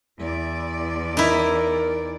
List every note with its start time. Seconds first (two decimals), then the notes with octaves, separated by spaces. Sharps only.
0.19 E2 E4 D5
1.17 D#4 E4 A#4